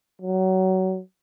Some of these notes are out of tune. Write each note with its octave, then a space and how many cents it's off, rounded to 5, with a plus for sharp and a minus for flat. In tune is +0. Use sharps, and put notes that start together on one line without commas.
F#3 +25